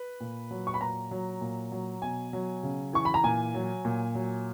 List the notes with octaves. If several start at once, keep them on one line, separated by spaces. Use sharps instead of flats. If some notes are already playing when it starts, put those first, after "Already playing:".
Already playing: B4
A#2
F#3
C#6
B5
A#2 A#5
F#3
A#2
F#3
B2 G#5
F#3
C#3
E3 C#6
B5
A#5
A#2 G#5
F#3
A#2
F#3